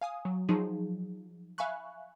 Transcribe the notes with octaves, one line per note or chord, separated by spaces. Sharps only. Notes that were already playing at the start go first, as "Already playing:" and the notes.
F5 G#5 D#6
F#3
F3 F#3 D#4 G#4
E5 F5 G#5 B5 C#6 F#6